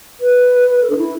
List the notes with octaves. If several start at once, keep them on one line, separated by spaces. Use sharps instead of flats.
B4
A4
D4
E4